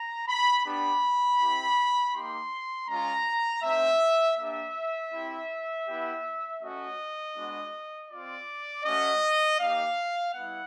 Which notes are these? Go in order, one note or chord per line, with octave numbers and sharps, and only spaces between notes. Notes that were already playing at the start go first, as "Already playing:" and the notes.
Already playing: A#5
B5
B3 D4 G4 B5
C4 E4 G4
A#3 D#4 G4 C6
G#3 C#4 F4 A#5
A3 C4 D#4 E5
A#3 D4 G4 E5
C4 E4 G4
B3 E4 G4
A3 C#4 F#4 D#5
G#3 B3 D4 F#4
C4 F4 D5
A3 C#4 F#4 D#5
A#3 D#4 G4 F5
G3 B3 E4 F#5